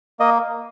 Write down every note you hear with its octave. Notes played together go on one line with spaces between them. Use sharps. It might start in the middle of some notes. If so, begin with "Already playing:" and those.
A#3 D#5